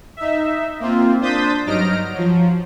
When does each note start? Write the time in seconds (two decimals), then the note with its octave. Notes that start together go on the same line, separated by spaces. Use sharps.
0.17 D#4 E5
0.80 A#3 C4 F4
1.21 D4 C5 D#6 G6 A6 B6
1.66 G2 F#3 D#4 F6 A#6 D7
2.13 F3 F#3